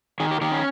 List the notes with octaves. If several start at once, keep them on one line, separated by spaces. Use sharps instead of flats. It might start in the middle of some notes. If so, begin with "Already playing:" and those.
D#3 G#4
G4
D#3 G4
C#4